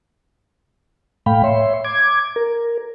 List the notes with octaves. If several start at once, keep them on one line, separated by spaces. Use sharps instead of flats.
A2 A3 F5 G5 B5
C#5 E5 C6
D6 G#6
A#4